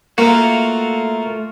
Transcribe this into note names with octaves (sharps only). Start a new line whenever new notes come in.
A3 A#3 F4 F#4